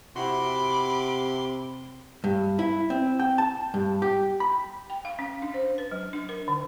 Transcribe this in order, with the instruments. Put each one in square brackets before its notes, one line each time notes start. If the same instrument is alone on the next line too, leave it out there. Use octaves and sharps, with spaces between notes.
[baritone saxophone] C3 [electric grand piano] C4 E4 F#4 [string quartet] B5 D6 [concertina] C6
[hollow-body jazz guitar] G2
E4
C4
G5
A5
G2
G4
B5
[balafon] G5
F5
C#4
D4
C5
B4
F#3
D4
A#4
D3